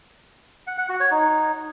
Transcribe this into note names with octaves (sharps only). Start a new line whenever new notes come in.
F#5
F#5
F#4
C#5
D#4